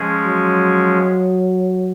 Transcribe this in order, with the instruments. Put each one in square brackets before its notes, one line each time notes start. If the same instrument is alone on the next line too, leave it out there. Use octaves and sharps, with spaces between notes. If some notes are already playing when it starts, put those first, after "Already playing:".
Already playing: [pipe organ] F3 G#3 C#4 G#4
[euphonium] F#3